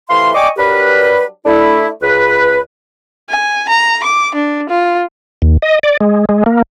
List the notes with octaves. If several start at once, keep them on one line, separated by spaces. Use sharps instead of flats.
C3 E3 A3 F5 C6
D5 D#5 G5 G#5 C#6 D6
F#3 G3 D4 G4 A#4 B4
A3 D4 E4
C#2 B4
G#5
A#5
D6
D4
F4
D#2
D#5
D5
G#3
G#3
A#3